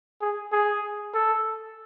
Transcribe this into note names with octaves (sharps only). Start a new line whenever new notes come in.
G#4
G#4
A4